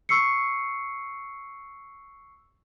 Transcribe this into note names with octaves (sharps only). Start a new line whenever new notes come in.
C#6 E6 C7 C#7